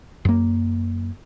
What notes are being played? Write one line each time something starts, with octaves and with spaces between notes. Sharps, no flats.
F#2 A#3